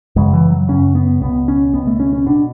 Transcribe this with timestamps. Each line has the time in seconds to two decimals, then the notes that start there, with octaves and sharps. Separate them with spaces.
0.16 F#2 C#3 G#3
0.33 E3
0.50 F#3
0.68 F#2 C#3 C#4
0.95 B3
1.21 C#2 B2 B3
1.48 C#4
1.74 C#2 B2 B3
1.87 A3
2.00 C#4
2.13 C#4
2.26 B2 D4